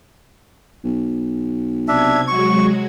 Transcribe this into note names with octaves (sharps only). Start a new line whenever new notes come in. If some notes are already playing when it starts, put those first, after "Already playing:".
B1
C3 D4 E5 G#6
F#3 G#3 F#4 C#6